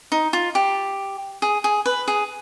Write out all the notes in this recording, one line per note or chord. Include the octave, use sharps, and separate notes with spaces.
D#4
F4
G4
G#4
G#4
B4
G#4